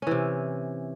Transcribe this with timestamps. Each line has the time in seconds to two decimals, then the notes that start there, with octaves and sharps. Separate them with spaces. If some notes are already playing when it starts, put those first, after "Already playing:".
0.02 C#4
0.07 E3
0.11 C3